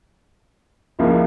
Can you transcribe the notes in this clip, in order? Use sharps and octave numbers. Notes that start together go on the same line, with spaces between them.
C#2 C#3 F3 A#3 E4